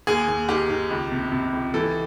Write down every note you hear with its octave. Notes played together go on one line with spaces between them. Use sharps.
D#2 G#4
D#2
D#3 G4
D#3
C#2
C3
C3
C#2
E3 A4